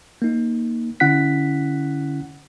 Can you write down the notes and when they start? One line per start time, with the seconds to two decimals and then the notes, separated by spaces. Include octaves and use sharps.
0.22 A#3 D#4
1.00 D3 C#4 E4 F#5 F#6 B6